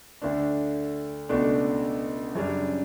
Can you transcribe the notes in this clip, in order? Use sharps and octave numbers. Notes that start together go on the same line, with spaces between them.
D2 D3 A3 D4
C#2 B2 A3 D4
F#2 C#3 G3 D4